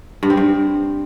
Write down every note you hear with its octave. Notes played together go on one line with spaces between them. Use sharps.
G2
C4
G2